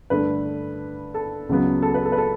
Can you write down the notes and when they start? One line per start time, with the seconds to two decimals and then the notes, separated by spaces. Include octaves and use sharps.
0.10 G2 D3 A3 B4
1.14 A4
1.49 C#2 C#3 F#3 B3
1.82 A4
1.94 B4
2.06 A4
2.12 B4
2.18 A4